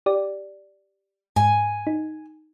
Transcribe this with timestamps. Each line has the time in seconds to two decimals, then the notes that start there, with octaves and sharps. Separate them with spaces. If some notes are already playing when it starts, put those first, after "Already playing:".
0.06 G4 D5
1.36 G#2 G#5
1.87 D#4